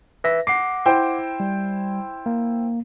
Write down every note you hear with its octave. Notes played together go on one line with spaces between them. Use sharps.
B4 E5 A#6
F#5 D6 C7
E4 C5 G5
G3
A#3